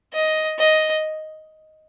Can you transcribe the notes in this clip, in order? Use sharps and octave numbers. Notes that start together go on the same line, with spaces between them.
D#5
D#5